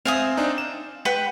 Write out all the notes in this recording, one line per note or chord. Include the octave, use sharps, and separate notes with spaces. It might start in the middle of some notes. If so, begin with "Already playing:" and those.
C4 C5 E5 F5 G#5 D#6
C4 D4 D#4
E7
B4 F#5 G5